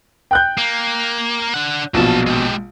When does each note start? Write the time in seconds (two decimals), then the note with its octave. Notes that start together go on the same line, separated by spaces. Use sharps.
0.31 G5 F#6 G6
0.58 A#3
1.54 D4 F#5
1.94 A#1 B2 F#3 A5
2.27 G#3 G4